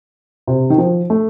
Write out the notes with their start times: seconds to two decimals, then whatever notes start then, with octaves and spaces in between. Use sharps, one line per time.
0.47 C3
0.70 D#3
0.78 F3
1.10 A3